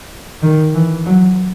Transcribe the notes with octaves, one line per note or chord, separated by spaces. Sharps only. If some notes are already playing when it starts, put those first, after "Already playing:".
D#3
E3
F#3